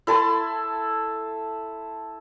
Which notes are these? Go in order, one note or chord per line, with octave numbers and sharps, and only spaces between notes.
E4 A4 A5 C6